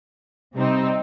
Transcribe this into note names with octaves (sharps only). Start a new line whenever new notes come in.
C3 G3 C4 D#4